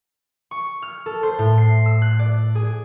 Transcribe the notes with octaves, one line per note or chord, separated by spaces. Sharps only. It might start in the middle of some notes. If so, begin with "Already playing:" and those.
C#6
F6
A4
C5
A2
C7
E6
F#6
D5
G#4